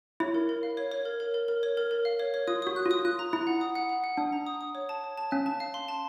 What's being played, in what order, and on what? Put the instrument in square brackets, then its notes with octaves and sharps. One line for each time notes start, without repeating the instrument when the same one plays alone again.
[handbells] E4 [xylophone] C#5
[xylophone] A#4
A#4
F5
C#5
C#5
A#4
A#4
A#4
A#4
C#5
A#4
A#4
F5
C#5
C#5
[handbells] F4 [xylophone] D#6
[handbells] F#4 [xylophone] D#6
[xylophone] F#6
[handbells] F4
[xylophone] D#6
[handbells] F4 [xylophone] F#6
[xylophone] A#5
[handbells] E4 [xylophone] A#5
[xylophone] F#5
D#6
F#5
F#5
F#5
[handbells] D4 [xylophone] D#6
[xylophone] A#5
D#6
D#6
C#5
A5
C#5
A5
[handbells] C#4 [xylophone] F5
[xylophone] A5
F5
C6
A5